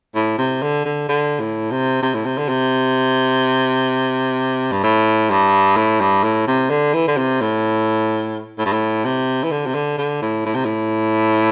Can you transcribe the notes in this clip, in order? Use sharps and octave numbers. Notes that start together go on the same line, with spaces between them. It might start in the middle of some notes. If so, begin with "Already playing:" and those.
A2
C3
D3
D3
D3
A2
C3
C3
A2
C3
D3
C3
G2
A2
G2
A2
G2
A2
C3
D3
E3
D3
C3
A2
A2
G2
A2
C3
E3
D3
C3
D3
D3
A2
A2
C3
A2